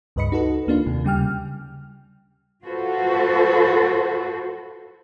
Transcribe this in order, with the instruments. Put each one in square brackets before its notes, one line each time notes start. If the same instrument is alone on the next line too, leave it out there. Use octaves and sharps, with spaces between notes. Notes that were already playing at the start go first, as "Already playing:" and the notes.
[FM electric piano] C#2 G2 B4 D#5 B5 C#7
D#4 F#4 A4 B4
D#2 A#3 D4 F4
D#2 C3
C#3 G3 G5 F6
[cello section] F4 F#4 A4 B4 C5